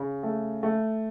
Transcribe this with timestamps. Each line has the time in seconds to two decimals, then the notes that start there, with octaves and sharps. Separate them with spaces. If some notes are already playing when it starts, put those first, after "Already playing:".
Already playing: C#3
0.23 A3
0.63 A3